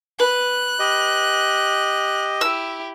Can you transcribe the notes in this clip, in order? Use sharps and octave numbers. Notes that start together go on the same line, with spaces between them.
B4 F#6
G4 D#5
E4 G4 E6